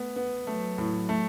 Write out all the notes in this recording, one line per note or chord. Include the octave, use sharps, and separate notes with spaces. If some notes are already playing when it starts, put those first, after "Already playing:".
Already playing: A3 B3
B3
F#3 A3
A2
A3